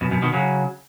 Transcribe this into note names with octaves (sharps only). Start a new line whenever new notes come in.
F#2 B2
F#2 B2
B2 D#3
C#3 F#3